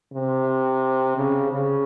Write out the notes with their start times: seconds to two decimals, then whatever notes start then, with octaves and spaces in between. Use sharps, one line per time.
0.14 C3
1.17 C#3
1.52 C#3